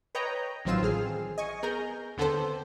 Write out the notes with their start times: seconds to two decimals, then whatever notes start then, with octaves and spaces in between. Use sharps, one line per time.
0.15 B4 C#5 D#5 G5 A#5
0.65 A1 D#3 F#3 C4 F4 E7
0.82 A1 C4 G#4 F6 C7
1.38 D#5 G#5 C#6
1.63 B3 G#4 A#4 A#5 G6
2.17 D#2 D3 B3 C4 A4 C5